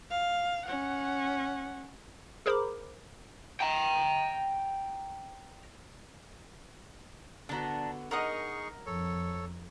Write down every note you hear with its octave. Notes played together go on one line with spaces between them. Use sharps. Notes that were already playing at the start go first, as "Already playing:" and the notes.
F5
C#4 F#5
G#4 A#4 C5 A#5 B5 D6
G5 A#5
D3 B3 D4 F#4 A#5
D#4 G#4 A#4 D#5 F#5 A#5 C#6 D#6
F2 A4 C#5